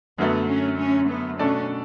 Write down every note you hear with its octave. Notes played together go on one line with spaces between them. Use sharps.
F#2 D3 F#3 A3 B3
C#4
C#4
B3
B2 A3 C#4 D4 A4 D5